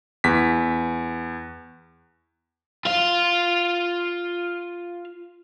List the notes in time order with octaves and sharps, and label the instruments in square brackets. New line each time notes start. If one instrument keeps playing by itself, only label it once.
[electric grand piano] E2 B6
[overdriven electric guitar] F4 F5